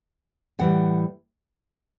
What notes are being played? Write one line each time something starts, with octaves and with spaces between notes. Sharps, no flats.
A2 E3 G3 F#5